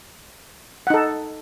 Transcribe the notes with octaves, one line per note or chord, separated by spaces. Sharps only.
D#4 A4 F#5